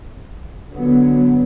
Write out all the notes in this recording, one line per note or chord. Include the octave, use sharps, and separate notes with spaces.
D3 F#3 B3